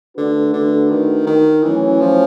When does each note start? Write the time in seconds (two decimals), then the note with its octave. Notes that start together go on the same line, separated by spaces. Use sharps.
0.16 D3 A3 D4 F#4 B4
0.53 D3
0.91 D#3
1.27 D#3
1.63 E3 F#3 A3 C#4
2.00 F3